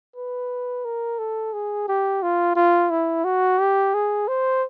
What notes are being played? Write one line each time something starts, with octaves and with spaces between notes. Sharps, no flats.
B4
A#4
A4
G#4
G4
F4
F4
E4
F#4
G4
G#4
C5